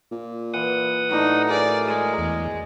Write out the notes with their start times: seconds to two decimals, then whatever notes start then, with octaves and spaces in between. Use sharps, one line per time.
0.12 A#2
0.54 E3 F#5 D#6
1.11 A2 F#3 D4 D#4
1.50 G#4 A#4 D5
1.88 G#3
2.18 E2